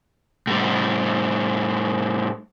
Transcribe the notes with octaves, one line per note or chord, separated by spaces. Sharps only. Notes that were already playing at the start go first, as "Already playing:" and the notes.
A2 G3